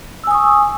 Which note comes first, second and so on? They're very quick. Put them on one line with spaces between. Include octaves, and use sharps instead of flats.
E6 G#5 D#6 C#6